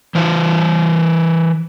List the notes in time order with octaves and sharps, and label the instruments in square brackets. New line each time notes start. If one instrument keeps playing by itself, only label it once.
[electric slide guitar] E3 C5